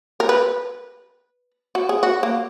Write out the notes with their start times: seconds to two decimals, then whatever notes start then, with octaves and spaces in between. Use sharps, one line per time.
0.20 A#4
0.29 B4
1.75 F#4
1.89 G#4
2.03 F#4
2.23 A#3